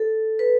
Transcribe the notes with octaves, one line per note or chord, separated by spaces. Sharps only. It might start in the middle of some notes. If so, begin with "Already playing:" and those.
Already playing: A4
B4